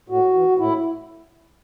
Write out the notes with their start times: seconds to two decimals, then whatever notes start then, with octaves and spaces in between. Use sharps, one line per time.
0.09 A2 F#4
0.34 E3
0.58 A2 E4